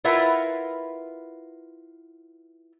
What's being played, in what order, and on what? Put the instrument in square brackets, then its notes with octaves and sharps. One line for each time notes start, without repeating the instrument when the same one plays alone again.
[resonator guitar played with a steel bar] E4 F4 A#4 B4 E5 F#5